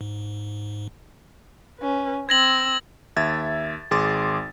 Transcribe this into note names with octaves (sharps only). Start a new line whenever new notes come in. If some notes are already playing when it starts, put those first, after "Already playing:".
G#2
C#4 B4
C4 E6 G#6 A#6 F#7
D#2 E5 G#6 A6
G#1 G#4 C6 D6 A6